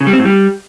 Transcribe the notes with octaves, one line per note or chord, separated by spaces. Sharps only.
C#3
G3
C4
A2
G3